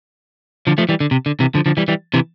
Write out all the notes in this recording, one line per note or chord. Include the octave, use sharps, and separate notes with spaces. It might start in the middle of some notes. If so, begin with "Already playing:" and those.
D3 F3
F3 A3
E3 G3
D3
C3
D3
C3 E3
D3 F3
D3 F3
E3 G3
E3 G3
C3 E3